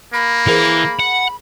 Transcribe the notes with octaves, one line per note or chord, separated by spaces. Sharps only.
A#3 B5
E3 G#4 A#4 C5
F#5